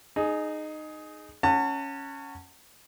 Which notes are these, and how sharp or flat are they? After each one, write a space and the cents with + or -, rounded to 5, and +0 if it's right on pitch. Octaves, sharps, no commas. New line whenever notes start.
D#4 -15 G#4 +15
C#4 +0 F#5 +0 A5 +40